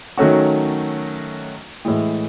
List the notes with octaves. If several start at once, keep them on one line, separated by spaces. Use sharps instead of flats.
D#3 F#3 A3 C#4 F#4
A2 E3 G#3